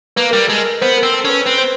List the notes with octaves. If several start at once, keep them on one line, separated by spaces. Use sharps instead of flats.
A#3 B4
G3 A#4
G#3 A4
A#4
B3 C5
A#4
C4
A4
C#4 B4
C4 B4
C5